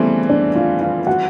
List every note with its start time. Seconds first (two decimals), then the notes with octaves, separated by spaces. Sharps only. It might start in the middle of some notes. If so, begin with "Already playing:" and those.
Already playing: C#3 E3 G3 A3 B3 C4 A4
0.29 D4 D5
0.55 F4 F5
0.81 F4 F5
1.07 F#4 F#5